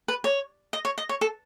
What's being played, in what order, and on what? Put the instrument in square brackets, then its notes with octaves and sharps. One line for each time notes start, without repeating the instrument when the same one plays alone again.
[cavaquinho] B4
C#5
D#5
C#5
D#5
C#5
A4